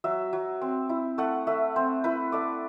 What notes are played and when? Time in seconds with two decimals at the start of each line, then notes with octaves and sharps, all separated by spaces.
0.04 F#3 E5
0.33 F#3
0.61 C4
0.89 E4
1.18 A3 F#5
1.47 A3 E5
1.76 C4 C5
2.04 E4 B4
2.32 A3 D5